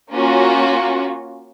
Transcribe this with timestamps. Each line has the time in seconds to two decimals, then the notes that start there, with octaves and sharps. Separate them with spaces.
0.13 A#3 C#4 F4 F#4